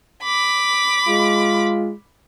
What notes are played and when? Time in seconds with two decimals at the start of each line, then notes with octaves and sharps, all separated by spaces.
0.24 B5 D6
1.06 G#3 F4